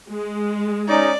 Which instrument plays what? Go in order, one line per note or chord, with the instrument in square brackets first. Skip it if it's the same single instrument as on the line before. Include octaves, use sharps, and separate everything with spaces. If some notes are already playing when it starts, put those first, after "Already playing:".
[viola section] G#3
[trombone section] C#4 D#4 [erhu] D5